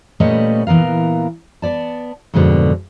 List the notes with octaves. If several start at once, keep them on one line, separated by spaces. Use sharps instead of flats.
A#2 G3 A3 C#4 B4 D#5
A#2 E3 B3 A#4 F5
B3 D5 A5
F2 G#2 B2 D3 G3